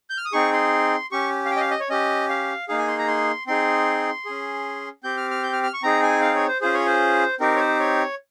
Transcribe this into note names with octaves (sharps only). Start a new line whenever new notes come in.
G6
F6
D#6
C4 D#4 G#4 C#6
C6
C#4 G4 C#6
F5
G5
D#5
F5
D#5
C#5
C#4 G4 D#5
F5
A#3 D#4 G#4 F5
G#5
C6
A#5
C6
C4 D#4 G#4 C6
C#4 G#4
C4 G4 G6
F6
F6
G6
F6
F6
C#6
C4 D#4 G#4 A#5
G#5
F5
C#5
C5
C#4 F4 G#4 C5
C#5
C5
C4 D#4 G4 A#4
C#5
C5
C#5